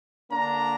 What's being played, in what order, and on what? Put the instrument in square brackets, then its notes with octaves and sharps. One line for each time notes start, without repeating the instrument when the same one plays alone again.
[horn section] D3 A#3 D4 A#5